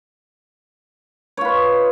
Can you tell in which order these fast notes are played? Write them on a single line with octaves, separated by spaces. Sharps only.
C#5 F4 B4 D#5